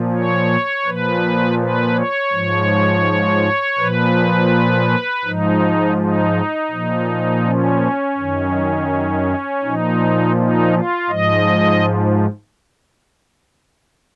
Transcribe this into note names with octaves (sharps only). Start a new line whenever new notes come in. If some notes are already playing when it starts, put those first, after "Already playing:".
Already playing: A#2 F3
C#5
A#2 F3 B4
B4
C#5
G#2 F3
A#2 F3 B4
G#2 F3 D#4
D#4
A#2 F3
C#4
F#2 D#3
A#2 F3 D#4
D#4
F4
G#2 F3 D#5